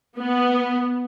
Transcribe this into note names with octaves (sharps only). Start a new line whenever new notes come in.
B3